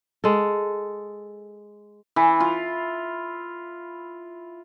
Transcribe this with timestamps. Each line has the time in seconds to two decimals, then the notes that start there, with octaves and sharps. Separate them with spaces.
0.24 G#3 A4
2.16 E3
2.40 F4